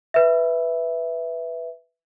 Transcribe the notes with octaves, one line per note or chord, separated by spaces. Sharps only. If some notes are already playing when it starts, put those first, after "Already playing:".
B4 E5